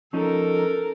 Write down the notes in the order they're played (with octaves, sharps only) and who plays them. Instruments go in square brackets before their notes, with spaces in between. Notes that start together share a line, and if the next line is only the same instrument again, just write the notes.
[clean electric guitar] F3 C#4 D#4 [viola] A4 A#4